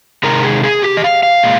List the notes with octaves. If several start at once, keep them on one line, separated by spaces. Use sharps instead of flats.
C3 D#3 G#3 A#4
G#4
G#4
G4
D#5
F5
F5
A#2 G#3